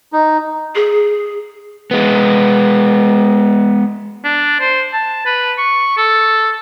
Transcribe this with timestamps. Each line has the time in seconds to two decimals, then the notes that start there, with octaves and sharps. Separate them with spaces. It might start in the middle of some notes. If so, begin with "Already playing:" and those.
0.13 D#4
0.75 G#4
1.91 G#3 B3
4.24 D4
4.60 C5
4.93 A5
5.26 B4
5.58 C#6
5.97 A4